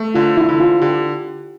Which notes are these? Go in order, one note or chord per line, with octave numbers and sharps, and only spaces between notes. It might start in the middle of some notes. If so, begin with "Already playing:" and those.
Already playing: A3
D3 F4
E4
D3
F4
D3 G4